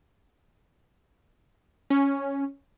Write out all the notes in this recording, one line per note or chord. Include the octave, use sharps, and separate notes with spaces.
C#4